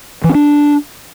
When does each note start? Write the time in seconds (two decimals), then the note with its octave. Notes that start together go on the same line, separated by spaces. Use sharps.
0.24 E3
0.29 C#4
0.35 D4